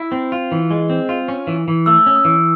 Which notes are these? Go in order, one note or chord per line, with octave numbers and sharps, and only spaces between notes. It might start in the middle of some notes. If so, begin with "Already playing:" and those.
Already playing: E4
C4
F4
E3
G#3
C4
F4
C#4
E3
E3
A3 E6
C#4
D#6
E3